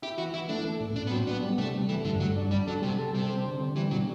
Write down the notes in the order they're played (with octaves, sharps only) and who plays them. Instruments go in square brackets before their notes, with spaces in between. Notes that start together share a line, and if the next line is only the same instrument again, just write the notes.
[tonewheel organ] E4 [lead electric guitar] G4
[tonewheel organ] E3 [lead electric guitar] F#4
[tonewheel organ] E3 [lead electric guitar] E4
[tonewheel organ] A3 [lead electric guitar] D4
[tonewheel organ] A3
A2
[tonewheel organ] A2 [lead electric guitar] D4
[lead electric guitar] B3
[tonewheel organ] F#3 [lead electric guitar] C4
[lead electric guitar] B3 [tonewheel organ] D4
[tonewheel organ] G3
[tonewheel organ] C3 [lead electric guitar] A3
[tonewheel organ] G3
[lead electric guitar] E3 [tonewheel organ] A3
[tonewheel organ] G2 [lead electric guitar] D3
[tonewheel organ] G2 [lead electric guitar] F#3
[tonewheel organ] D4
[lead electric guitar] G3 [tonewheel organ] D4
[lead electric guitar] F#3 [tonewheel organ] A4
[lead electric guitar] C3 [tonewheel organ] G3
[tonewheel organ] A4
[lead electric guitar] C3 [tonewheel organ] G3
[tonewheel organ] C4
D3
D3
[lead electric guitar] E3 [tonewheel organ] G3
[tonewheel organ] B2 [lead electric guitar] F#3